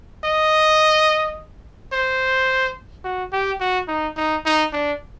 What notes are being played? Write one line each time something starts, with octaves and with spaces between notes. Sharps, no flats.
D#5
C5
F#4
G4
F#4
D#4
D#4
D#4
D4